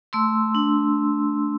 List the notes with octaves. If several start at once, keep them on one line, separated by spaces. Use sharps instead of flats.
A3 C6 E6
D4